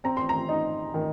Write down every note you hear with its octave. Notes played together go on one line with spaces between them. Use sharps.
C4 A#5
C6
A#5
D#4
D#3